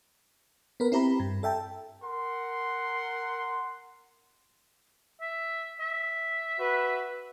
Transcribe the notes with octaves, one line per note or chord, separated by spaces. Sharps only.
B3 A#4 B4
C4 E4 G4 A#5 B5
G2
A4 E5 G5 A5
A#4 F#5 C6
E5
E5
F#4 B4